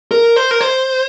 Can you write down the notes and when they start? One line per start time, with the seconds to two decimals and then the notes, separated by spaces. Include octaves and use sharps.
0.11 A#4
0.36 C5
0.51 A#4
0.61 C5